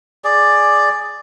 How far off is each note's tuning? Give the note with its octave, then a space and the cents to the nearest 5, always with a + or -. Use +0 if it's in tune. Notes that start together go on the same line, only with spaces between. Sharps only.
G#4 +0 D5 +5